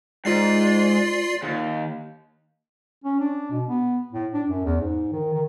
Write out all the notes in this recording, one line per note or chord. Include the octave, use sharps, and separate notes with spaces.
G#2 F4 D5 C7
D#2
C#4
D4
B2
B3
A2
D4
F#2
E2
G#2
D#3
D#3